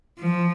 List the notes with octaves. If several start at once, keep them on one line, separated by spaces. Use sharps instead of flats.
F3